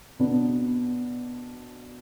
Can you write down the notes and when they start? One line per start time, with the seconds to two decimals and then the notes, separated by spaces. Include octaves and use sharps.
0.19 B2 B3 D4